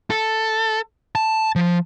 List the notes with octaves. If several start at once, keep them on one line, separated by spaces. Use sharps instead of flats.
A4
A5
F3